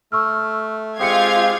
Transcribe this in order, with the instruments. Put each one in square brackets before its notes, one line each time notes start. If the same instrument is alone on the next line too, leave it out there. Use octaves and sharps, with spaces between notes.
[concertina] A3 [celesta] C#6 E6 F6
[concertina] G#3 C4 G4 [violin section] F4 F5 G#6 [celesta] D#6 C#7